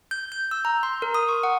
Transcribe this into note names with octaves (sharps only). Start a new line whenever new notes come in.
G6
G6
E6
A#5
C6
A#4
D#6
C#6
F#5